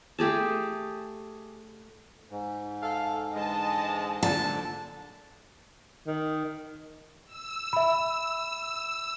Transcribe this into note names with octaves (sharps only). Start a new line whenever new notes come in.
A3 G4 G#4 A5
G#2
A4 F5
D3 E3 G#3 D#5 A5
A#2 D3 A5
D#3
E6
E5 B5